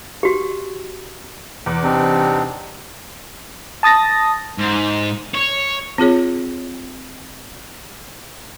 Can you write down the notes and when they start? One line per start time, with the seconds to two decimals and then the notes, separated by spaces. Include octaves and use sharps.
0.23 F#4 G4
1.66 E2 D6
1.83 C3 C4 D4 D#4
3.83 A5 D#6 A6 A#6
4.58 G#2
5.35 C#5
5.98 C4 F4 G#4 C#5